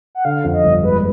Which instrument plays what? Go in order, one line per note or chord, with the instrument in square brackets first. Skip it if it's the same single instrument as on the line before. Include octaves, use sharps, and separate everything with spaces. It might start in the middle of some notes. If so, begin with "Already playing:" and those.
[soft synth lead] F#5
[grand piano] D3 [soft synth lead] F5
[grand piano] F2
[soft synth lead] D#5
[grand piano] G1
[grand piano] G#3 [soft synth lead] B4